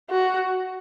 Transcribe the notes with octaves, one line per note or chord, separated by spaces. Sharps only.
F#4